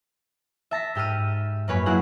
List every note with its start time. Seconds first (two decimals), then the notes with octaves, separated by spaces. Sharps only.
0.71 E5 A5 A#6 B6
0.95 G#2 G4 E6 F6 D#7
1.68 F#2 A#3 B4 C#5 G#5 B5
1.86 F#3 A#3 E4 F#4 G#4 F#5